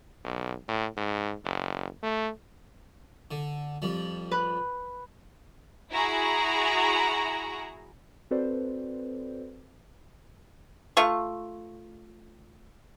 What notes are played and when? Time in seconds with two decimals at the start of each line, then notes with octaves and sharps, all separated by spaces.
0.24 B1
0.68 A2
0.97 G#2
1.45 F#1
2.03 A3
3.31 D3
3.82 F2 G3
4.31 B4
5.90 E4 F#4 G#4 A#5
8.31 C4 F#4 A4 B4 C5 D5
10.97 A3 F4 C#6